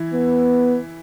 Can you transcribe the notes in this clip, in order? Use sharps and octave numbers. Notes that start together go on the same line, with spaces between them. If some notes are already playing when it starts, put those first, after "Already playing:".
Already playing: E3 E4
B3